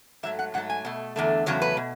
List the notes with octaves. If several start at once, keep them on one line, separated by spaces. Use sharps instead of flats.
G#2 F#3 A3 E5
F#5
G#2 F#3 A3 F#5
G#5
B2 A3
E2 D3 A3
E2 C#3 F#3 A3 C#5
B4
B2